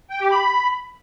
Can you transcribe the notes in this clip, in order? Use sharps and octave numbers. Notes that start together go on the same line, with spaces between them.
G5
G4
B5